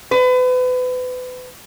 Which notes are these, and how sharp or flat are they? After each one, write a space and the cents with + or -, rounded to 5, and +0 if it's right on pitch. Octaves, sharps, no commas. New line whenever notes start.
B4 +35